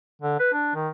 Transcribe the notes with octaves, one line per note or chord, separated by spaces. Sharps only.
D3
B4
D4
D#3